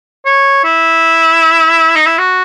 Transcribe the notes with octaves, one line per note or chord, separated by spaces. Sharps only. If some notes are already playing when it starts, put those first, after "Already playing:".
C#5
E4
D#4
E4
F#4